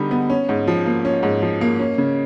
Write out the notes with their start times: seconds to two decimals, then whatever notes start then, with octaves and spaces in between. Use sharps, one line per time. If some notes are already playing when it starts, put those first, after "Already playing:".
Already playing: D3 G3 B3 D#4
0.11 B3
0.30 C#4
0.49 G#2
0.67 F3
0.86 A#3
1.05 C#4
1.23 G#2
1.42 F3
1.61 A#3
1.80 C#4
1.98 C#3